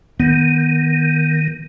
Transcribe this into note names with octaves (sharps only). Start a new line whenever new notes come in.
D#3 B3